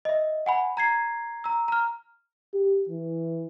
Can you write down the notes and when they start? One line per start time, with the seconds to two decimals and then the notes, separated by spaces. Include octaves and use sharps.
0.05 D#5 E5
0.46 F#5 G#5 B5
0.77 A#5 G#6 C7
1.44 A#5 E6
1.68 A#5 F6
2.54 G4
2.89 E3